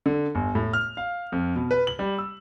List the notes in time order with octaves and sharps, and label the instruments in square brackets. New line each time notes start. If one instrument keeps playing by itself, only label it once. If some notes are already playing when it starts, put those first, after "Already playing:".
[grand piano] D3
G1
A2
F6
F5
F2
B2
B4
F#7
G3
E6